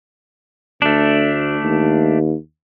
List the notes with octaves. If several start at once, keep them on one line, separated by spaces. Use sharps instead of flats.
D2 A3 D4
D#2